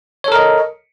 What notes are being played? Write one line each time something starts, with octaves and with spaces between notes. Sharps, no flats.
A4 A#4 C#5 D#5